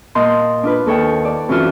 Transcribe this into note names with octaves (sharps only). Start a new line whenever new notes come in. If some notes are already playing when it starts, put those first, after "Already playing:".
A#2 D#5 A5 C6 G6
D4 F4 B4
D#2 A4 C#5 G5
D5
F#2 C3 E3 F4 F#4